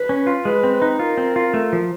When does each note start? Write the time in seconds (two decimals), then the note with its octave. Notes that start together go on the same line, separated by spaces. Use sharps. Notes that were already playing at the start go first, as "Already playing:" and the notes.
Already playing: B4
0.09 C#4
0.27 F4
0.45 G#3 B4
0.63 C4
0.82 D#4
0.99 F4 A#4
1.18 C4
1.36 F4
1.54 A3
1.73 F3